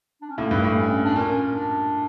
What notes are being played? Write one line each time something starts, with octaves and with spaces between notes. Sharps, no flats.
D4
C#4
A2 A#3
G2
A2
C#4
D4
A#2 C#4
D4